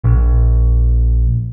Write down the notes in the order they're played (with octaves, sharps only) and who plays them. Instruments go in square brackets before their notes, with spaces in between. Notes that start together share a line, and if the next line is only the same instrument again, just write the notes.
[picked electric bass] A#1